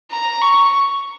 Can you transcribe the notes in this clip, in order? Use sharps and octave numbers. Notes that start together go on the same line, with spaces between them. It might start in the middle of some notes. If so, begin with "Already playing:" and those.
A#5
C#6